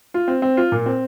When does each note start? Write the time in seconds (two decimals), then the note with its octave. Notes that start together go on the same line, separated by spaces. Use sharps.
0.14 F4
0.28 C4
0.42 C4
0.57 F4
0.72 A#2
0.86 C4